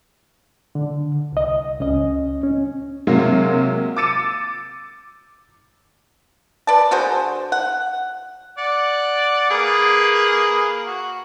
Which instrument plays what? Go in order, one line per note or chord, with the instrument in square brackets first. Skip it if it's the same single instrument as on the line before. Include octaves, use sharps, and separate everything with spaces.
[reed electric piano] D3
C2 D#5
C#2 C#4 D#5
C#4
[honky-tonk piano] C3 F#3 G#3 A#3
D6 E6 A6 C#7 D#7 E7
[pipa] B4 D5 A5
D3 F#4 G#4 C5
F#5
[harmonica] D5 F#5
A#3 G#4 B4
F#4